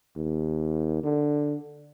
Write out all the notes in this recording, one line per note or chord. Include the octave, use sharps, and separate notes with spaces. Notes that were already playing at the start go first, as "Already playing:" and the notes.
D#2
D3